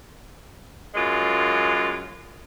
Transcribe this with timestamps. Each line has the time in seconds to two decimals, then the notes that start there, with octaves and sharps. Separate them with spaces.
0.95 F#2 G#3 F4